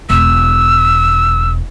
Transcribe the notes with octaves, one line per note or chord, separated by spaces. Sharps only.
E1 E6